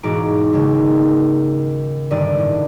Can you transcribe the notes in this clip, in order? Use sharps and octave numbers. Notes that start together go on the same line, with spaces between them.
E1 G#2 F#4 A#5 D6 D7
D#2 C#3 G#3
G1 G2 D#3 D5 D7 D#7
A2